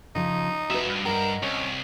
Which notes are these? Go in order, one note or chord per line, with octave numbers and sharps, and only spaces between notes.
C#3 F3 D#4
F3 F#4 B4 E5
G2
A#4 D#5 E5 F#5
C2 C#4